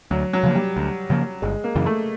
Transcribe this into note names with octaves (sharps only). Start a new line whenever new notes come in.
D2 F#3
F#3
C#3 F3 A#3
G3
D2
C#3 F3 A#3
G1 G#3
A#3
F#2 C#3 E3
A3